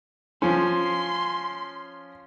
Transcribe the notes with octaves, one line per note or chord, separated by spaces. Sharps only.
F3 C#4 C6